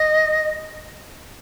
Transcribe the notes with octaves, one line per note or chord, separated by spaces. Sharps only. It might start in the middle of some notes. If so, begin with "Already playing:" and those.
Already playing: D#5